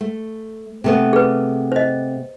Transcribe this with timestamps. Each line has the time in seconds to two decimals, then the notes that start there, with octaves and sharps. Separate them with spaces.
0.01 A3
0.84 C3 A3 B3
1.13 G#4 B4
1.72 C5 D#5